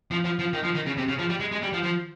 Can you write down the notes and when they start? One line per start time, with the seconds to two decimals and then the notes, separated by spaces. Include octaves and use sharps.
0.11 F3
0.24 F3
0.39 F3
0.53 D#3
0.64 F3
0.75 D#3
0.86 C#3
0.98 C3
1.08 C#3
1.19 F3
1.29 G3
1.40 G#3
1.52 G#3
1.62 G3
1.73 F3
1.83 F3